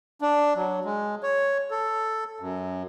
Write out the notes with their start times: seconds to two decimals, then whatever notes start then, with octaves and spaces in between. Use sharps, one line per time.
0.21 D4
0.55 F#3
0.85 G#3
1.23 C#5
1.71 A4
2.40 F#2